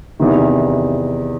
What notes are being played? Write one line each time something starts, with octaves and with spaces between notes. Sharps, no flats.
E2 C3 D#3